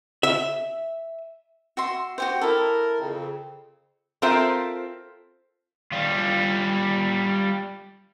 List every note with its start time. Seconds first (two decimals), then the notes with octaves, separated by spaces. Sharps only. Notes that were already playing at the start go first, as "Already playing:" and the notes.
0.23 E5
1.77 F#4 E5 C6
2.18 F#4 G4 C5
2.42 E4 A4 A#4
3.00 F2 C#3 C4
4.22 C4 F4 A4 A#4 C5 E5
5.92 G3 F4